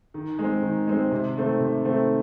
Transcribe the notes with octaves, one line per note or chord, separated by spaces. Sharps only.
D#3
G#3 C4
D#3
G#3 C4
C3
D#3 A3 C4
C3
D#3 A3 C4